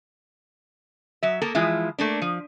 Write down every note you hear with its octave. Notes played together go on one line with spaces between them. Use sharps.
F#3 E5
A#3 A4 A#4
E3 F3 G#3 E4 F4
A3 A#3 D4
F3